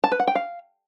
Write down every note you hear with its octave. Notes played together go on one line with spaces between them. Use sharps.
A5
B4
F#5
G5
F5